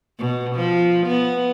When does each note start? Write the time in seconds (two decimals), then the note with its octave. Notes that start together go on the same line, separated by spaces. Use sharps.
0.19 B2
0.56 F3
1.07 B3